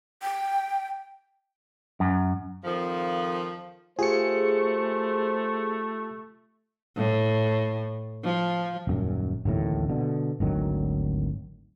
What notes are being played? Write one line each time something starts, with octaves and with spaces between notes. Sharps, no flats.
G5
F#2
F2 D#3 F3
A3 F4 G4 G#4 C5 C#7
A2
F3
D#1 F#2
D1 A1 D#2 A2
B2 D3
G#1 D2 D#3 F#3